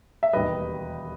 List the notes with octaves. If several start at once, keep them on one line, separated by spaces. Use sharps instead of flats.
E5
E1 D#2 D#3 G3 B4 D#5